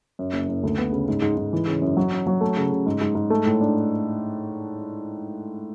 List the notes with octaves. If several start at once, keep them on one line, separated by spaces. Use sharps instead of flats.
F#2
F#1
F#1
D2
B3
C#3
G#2
G#2
G#2
E3
C#3
F#2
F#3
C#4
F#3
A3
C#3
C#3
G#2
G#2
G#2
A3
A2
D4